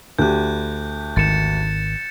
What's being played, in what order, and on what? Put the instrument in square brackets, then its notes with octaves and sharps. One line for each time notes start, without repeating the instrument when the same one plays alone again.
[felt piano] D2 G4 [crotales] F#6 G6
[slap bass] G#1 D#3 [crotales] A6 C#7 E7